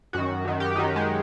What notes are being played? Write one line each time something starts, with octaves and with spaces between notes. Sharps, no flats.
F#2 D#3 F#4
F#2 D#3
G4
F#2 D#3 D#4
G#3